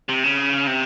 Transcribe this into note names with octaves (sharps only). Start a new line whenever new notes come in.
C3
C#3
C3